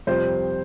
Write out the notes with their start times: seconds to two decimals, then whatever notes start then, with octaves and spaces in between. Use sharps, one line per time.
0.07 F2 C3 G3 C5